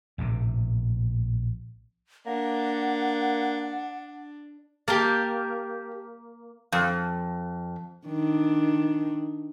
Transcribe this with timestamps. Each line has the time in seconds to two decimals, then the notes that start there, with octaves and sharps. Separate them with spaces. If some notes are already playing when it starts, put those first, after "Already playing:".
0.18 A#1 A2 C3
2.26 A#3 D4 F#5
4.88 A#3 G4 A#4 A5
6.72 F2
8.06 D#3 D4